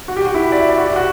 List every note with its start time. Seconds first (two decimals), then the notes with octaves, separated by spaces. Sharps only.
0.08 F#4
0.17 G4
0.26 F#4
0.34 E4
0.43 F#4
0.52 D5
0.60 E5
0.69 D5
0.78 F#4
0.87 G4
0.96 F#4